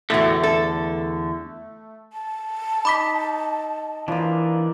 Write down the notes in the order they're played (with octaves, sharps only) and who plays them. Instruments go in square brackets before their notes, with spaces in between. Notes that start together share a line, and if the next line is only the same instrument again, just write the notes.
[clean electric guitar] E2 D3 [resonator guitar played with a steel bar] A2 F#4 [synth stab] A3
[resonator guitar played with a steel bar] A4
[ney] A5
[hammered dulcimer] D#4 [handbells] B5 D6 B6
[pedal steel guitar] E3 D4 [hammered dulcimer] F3 A#3